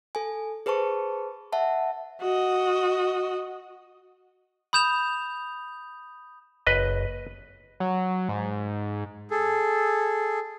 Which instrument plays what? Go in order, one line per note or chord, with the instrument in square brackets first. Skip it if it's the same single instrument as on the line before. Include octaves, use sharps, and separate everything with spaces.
[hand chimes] A4 G#5
G#4 B4 C5 A5 C#6
E5 F#5 A5
[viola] F#4 D#5
[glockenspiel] B5 D#6 G6 E7 F7
[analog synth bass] F#1 [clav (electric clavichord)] B4 D#5
[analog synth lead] F#3
G#2
[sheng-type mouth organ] G#4 A4